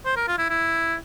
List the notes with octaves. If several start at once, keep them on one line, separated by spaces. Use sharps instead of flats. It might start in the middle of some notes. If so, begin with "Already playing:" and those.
C5
A#4
F4
E4
E4